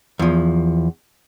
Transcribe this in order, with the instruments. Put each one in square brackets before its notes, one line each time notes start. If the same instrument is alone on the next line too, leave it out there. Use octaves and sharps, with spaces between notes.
[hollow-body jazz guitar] E2 F3